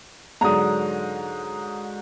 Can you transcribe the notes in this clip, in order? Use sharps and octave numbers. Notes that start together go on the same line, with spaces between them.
G#2 D3 F#3 A#5 D#6